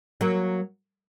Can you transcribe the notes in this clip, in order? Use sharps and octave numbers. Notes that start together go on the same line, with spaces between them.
F#3 A#3